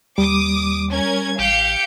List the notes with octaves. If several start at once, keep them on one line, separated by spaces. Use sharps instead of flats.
D#2 G3 D6 D#6
C#4 A#4 G#6
A1 G4 F5 G6 C#7